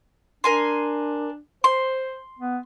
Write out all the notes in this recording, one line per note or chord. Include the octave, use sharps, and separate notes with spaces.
D4 A#4 G#5 C6
C5 C6
B3